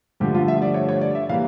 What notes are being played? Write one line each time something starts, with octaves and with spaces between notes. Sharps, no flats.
G2 D3 F3 A3 G4
F4
E5
D5
C#5
C#5
D5
E5
E3 G3 A#3 F5